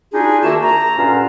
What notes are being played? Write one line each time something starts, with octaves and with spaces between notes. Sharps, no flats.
G3 D4 D#4 F4 F#4 G#4
C2 D#3 A#3 F#4 E5 A5
A#5
G2 A#2 D3 C#4 D4 F4